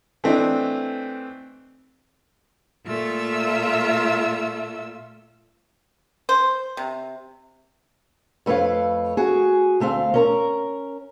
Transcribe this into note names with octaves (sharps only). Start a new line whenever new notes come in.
E3 A3 C4 D4 D#4
A#2 A3 F4 E5 E6
C5
C3
F2 A3 B4 C#5 F5
F#4 G#4
D2 A3 C4 F5
C#4 A#4 A#5